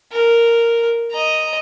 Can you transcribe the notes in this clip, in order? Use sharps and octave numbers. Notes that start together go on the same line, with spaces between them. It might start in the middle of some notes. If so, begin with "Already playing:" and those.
A#4
D#5 A#5